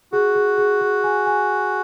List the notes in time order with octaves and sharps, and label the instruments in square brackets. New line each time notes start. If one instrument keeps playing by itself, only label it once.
[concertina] F#4 [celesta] G#4
[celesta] G#4
G#4
G#4
G#5
G#5